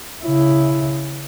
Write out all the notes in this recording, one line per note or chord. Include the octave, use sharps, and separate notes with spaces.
C#3 E4